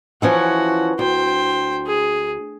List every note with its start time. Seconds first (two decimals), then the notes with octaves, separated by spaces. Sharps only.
0.22 E3 F3 C#4 F#4 F#5
0.99 D2 C5 G5
1.87 G#4